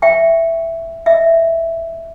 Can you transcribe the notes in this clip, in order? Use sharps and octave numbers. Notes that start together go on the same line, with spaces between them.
E5 G5 C#6
D#5 E5